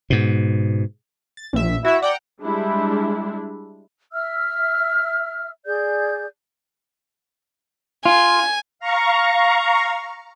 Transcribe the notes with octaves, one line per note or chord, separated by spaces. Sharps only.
G#2 B2
A6
A#1 E5
E4 F#4 E5
D5 F#5 G5 A#5
G3 G#3 D4 E4
E5 E6 F6
G#4 D5 G6
F4 G#5
F5 A#5 C#6